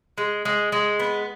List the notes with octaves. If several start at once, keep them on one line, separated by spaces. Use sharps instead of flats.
G#3
G#3
G#3
B3